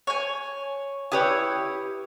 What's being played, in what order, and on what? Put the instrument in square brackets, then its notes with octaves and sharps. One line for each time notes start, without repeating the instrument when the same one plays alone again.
[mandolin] C#5 G#5
[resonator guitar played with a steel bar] E4 G4 C#5 [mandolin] B4 D#6